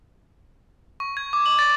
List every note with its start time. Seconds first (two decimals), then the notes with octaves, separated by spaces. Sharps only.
1.00 C#6
1.17 G#6
1.33 D6
1.46 F#7
1.59 A6